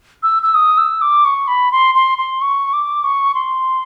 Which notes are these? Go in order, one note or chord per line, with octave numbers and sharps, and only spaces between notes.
E6
E6
D#6
E6
D6
C#6
B5
C6
C6
C6
C#6
D6
C#6
C6